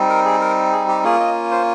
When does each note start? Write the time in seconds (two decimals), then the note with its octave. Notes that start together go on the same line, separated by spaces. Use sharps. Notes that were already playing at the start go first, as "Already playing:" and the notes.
Already playing: G3 C4 D#4
0.09 A#4
0.25 G#4
0.41 A#4
0.72 G#4
0.88 G4
1.04 A#3 C#4 F4 G#4
1.20 D#5
1.51 C5